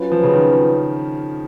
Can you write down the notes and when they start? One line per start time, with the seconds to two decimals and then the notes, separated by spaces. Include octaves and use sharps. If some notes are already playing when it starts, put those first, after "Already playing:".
Already playing: F#3 C#4 F4 B4
0.12 F3
0.23 C#3
0.33 D#3